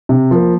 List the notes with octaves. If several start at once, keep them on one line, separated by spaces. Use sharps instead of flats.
C3
F3 A#3